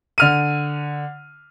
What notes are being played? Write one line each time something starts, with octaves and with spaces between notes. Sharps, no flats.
D3 F6 D#7